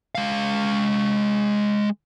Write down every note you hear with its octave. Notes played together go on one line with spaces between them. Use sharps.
G#3 F5